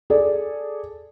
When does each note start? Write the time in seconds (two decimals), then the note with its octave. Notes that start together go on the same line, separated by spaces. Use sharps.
0.10 G#4 A4 D5